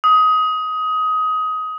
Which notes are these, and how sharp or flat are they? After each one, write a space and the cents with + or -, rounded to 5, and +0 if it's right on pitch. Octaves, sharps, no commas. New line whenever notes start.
D#6 +20